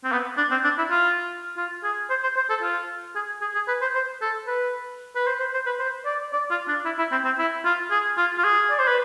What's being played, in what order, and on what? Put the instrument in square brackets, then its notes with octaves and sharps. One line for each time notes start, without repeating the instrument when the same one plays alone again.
[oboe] C4
B3
D4
C4
D4
E4
F4
F4
G#4
C5
C5
C5
A4
F4
G#4
G#4
G#4
B4
C5
C5
A4
B4
B4
C5
C5
C5
B4
C5
D5
D5
F4
D4
E4
E4
C4
C4
E4
F4
G#4
F4
F4
G#4
D5
C5
B4